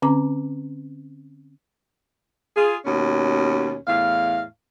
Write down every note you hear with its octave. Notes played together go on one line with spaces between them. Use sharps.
D3 C4 C#4 A#5 D6
F4 G#4
D#2 B2 C#4
E2 A2 F5